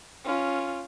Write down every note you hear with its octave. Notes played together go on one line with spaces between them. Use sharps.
C#4 F4